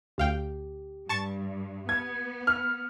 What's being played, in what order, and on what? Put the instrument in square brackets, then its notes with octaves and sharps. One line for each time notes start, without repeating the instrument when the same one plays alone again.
[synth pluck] D2 F5 G5 [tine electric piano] G4
[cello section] G2 [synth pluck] A5 C#6 A6
[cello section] B3 [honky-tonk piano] G#6
[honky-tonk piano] F6